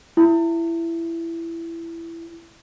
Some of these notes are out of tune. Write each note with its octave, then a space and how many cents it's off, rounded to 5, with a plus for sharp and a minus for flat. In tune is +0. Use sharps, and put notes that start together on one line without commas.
E4 +15